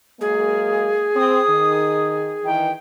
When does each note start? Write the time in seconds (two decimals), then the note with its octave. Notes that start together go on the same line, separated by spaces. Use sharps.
0.21 F#3 G#3 A#3 G#4
1.16 C4 D#6
1.49 D#3
2.45 D#3 E3 G5